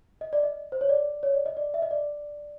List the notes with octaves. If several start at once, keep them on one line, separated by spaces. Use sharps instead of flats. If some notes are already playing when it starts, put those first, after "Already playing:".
D#5
D5
D#5
C5
C#5
D5
C#5
D5
D#5
D5
E5
D#5
D5